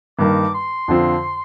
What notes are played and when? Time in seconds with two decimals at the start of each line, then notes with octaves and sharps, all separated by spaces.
0.19 G2 D#3 A#3 D6
0.54 C6
0.88 F2 D3 F3 C4 F4